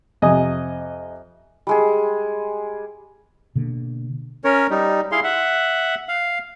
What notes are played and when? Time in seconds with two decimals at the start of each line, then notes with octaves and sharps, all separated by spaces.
0.22 F2 C3 D#5 G#5 D#6
1.67 G3 G#3 G#4
3.55 B2 D3 A#3
4.44 C#4 A#4 C#5
4.70 G3 D#4
5.12 E4 G#4 F5 C6
5.24 E5 F#5
6.08 F5